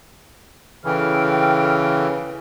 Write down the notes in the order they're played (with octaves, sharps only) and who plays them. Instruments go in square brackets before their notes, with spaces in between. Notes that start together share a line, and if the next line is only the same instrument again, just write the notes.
[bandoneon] C#3 E3 [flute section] A4 G5 F6